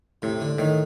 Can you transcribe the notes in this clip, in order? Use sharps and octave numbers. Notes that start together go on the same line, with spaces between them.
A2 C3
D3
A2 D#3